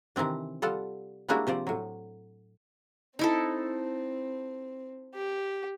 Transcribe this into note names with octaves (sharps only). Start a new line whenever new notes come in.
C3 D#3 E3 C4 D4
G3 F4 A4 F#5
G3 G#3 A#3 D4 E4 F#4
C3 F3 C5 D5
A2 F#3
C4 D#4 E4 A4
G4